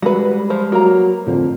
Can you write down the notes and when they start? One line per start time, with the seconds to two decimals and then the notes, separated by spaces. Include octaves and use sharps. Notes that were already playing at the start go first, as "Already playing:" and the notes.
0.02 G3 G#3 F#4 G#4 B4
0.50 F3 C5
0.72 F#3 A#3 A#5
1.27 F2 A2 D3 F3